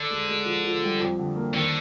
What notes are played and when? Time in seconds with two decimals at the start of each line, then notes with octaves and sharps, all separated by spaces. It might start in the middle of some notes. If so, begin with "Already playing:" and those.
Already playing: D3
0.10 G#3
0.28 G#3
0.46 F3
0.64 F3
0.82 G3
1.00 F2
1.19 D3
1.36 A#3
1.54 D3 D#3